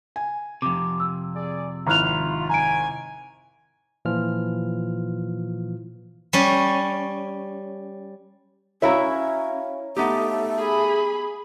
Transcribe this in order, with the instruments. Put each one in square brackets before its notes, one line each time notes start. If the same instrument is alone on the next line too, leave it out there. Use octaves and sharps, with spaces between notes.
[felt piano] G#5
[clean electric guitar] F2 C3 [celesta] D6
[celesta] E6
[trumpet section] G#4 D5
[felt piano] G#1 E4 F#6 [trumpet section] F4 [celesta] A#5 F6 F7
[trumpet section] G#5 [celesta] A#5 D7
[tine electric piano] A#2 E3 F3 F4 F6
[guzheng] G3 C#4
[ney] C#4 [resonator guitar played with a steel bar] E4 F#4 E5 [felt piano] C#5 F5 A#5
[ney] A3 [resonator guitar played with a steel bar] B3 D#4 G4
[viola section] G#4 B5